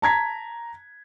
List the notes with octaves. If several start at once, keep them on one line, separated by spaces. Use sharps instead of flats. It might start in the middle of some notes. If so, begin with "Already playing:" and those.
A5 A#5 G#6 B6